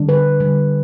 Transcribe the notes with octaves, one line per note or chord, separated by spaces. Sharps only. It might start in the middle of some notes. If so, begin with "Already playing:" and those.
Already playing: D3 G3 D4
B4
D3 G3 D4